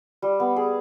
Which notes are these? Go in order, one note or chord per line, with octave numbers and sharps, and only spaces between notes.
G3
B3
G#4